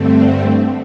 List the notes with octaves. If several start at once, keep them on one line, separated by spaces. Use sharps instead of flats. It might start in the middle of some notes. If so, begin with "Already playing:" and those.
Already playing: G2 D3 A3 C4